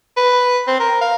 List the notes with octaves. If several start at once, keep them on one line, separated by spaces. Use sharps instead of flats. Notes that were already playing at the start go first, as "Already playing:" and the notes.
B4
C4
A#4
F5